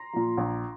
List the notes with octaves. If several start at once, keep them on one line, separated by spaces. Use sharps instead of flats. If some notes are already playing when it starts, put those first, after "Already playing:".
Already playing: A#5 C6
A#2 F3
A#1